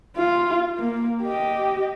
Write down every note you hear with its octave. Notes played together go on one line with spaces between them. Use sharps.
F4
A#3
G4 D#5